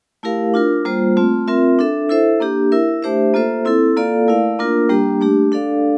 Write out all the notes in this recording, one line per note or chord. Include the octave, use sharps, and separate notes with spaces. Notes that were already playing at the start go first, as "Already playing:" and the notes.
A3 E4 G4 A#4 F5
D4 F4 A#4
G3 A#3 F4 C5
A3 C4 F4
C4 F4 A#4 E5
D4 A4 E5
E4 A4 C5 E5
A#3 D4 G4
E4 A#4 E5
A3 D4 G4 C5 E5
A#3 F4 A4 C5 E5
C4 E4 A4
A#3 F4 A4 D5 F5
A3 E4 A#4 D5 F5
A#3 D4 F4 A#4
G3 A#3 D4 G4
A3 D4 G4
D4 A4 D5 F5